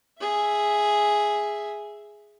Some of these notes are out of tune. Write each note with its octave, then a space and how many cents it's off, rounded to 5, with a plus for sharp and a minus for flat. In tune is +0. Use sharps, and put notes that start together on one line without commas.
G#4 +0 E5 +0